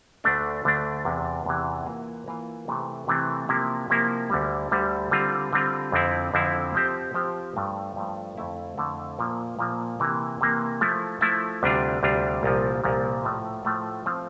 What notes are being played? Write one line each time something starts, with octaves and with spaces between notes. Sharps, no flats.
D2 D3 A3 D4
D2 D3 A3 D4
E2 C3 E3
E2 C3 E3
E3 A#3 F4
E3 A#3 F4
C3 E3 A3 C4
C3 E3 A3 C4
C3 F3 A#3 E4
C3 F3 A#3 E4
D2 D3 G3
D2 D3 G3
D3 G3 C4 F4
D3 G3 C4 F4
F2 D3 F3 C4 E4
F2 D3 F3 C4 E4
F3 C4 G4 C5
F3 C4 G4 C5
G2 F3 A3
G2 F3 A3
F2 D3 A3 E4
F2 D3 A3 E4
A#2 F3 A#3
A#2 F3 A#3
C3 E3 A#3
C3 E3 A#3
F3 A3 E4
F3 A3 E4
D2 C3 G3 D4 F4
D2 C3 G3 D4 F4
C2 A#2 F3
C2 A#2 F3
A2 F3 A3
A2 F3 A3
F3 A3 C4 F4